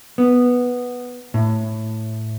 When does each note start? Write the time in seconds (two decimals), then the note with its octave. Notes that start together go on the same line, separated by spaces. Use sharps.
0.18 B3
1.34 A2